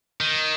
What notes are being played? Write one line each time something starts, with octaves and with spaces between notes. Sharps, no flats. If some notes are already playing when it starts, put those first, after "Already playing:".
D#3